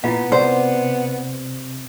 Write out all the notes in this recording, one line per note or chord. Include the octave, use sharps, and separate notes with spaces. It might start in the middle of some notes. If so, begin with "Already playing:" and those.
A#2 B3 E4 F4 F5
C3 C5 D5 F#5